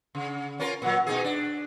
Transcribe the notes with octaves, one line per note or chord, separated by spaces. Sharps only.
C#3
C#4 F4 A#4
A#2 F#3
B2 D#4 G#4
D4